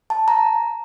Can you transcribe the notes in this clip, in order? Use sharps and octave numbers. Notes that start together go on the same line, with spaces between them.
A5
A#5